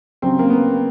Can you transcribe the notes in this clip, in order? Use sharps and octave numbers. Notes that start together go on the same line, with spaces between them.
C#3 F#3 C4
A#3
B3